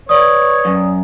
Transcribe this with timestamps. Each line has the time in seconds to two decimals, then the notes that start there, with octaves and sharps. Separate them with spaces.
0.09 B4 C#5 D5 D#6
0.65 F#2